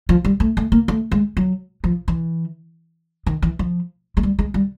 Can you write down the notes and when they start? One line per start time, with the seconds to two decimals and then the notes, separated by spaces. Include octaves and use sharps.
0.09 F3
0.25 G3
0.40 A3
0.57 A3
0.72 A#3
0.88 A3
1.11 G#3
1.37 F#3
1.84 F3
2.08 E3
3.26 D#3
3.42 E3
3.59 F3
4.17 G#3
4.23 G3
4.39 G#3
4.54 G3